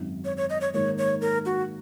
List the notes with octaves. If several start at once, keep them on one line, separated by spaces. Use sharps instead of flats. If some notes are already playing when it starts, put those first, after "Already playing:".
Already playing: G#1 F#2 F#3
C#5
C#5
D#5
C#5
G#2 D#3 A#3 D#4 C#5
C#5
A#4
F#4